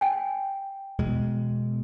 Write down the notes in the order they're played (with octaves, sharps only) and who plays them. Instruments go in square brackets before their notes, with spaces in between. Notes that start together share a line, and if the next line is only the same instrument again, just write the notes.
[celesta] G5 G#5
[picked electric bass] E2 B2 G#3